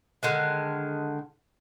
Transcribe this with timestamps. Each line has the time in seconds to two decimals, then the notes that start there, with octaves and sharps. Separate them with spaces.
0.23 D3 D#3 G#3